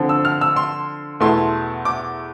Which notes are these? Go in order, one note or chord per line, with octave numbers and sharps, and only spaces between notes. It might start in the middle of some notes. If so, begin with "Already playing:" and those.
Already playing: D3 F3 C4
E6
F6
E6
C6
E2 B2 A3 E4 C6
D6